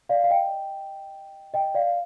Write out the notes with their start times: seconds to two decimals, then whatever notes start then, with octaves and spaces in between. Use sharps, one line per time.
0.09 D5 F5
0.24 F5
0.31 D#5 G5
1.54 D#5 G5
1.75 D5 F5